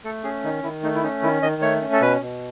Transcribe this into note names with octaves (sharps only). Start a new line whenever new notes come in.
A3 A4
C#4 G#4
D#3 D#4
D#3 E4
A3 D#4
E4
C#4 D#4
D#3 E4
D#3 D#5
A3 C#5
C#4
A4
B2 B4
B2